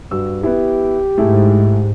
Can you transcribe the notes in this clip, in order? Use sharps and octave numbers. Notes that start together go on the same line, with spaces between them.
G2 F#4 E6
B3 E4 G4
G#2 A3 E4 G#4